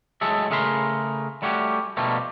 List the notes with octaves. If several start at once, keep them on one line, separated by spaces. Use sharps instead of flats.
A2 F#3 G#3 G#4 A4 E5
C#3 A3 G#4 A#4 B5 C6
G3 A3 C#4 F#4 G4
B2 F3 G3 A3 A#3